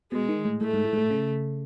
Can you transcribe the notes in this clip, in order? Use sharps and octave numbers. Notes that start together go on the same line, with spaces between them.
B2 G#3
D#3
A2
A2 A3
G#2
A2
G#2
A2
C#3